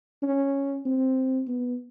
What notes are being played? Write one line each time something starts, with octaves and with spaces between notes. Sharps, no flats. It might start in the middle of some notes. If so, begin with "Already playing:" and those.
C#4
C4
B3